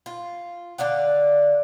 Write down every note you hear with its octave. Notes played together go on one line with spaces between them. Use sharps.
F4
D3 D5 F5 F#5